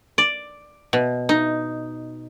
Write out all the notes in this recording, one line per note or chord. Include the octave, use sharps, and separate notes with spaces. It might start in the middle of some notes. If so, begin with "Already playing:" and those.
D5
B2
D#4